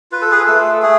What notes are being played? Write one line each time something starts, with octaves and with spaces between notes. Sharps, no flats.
F4 B4
A4
G#4 B4
A3 A4
A3 G#4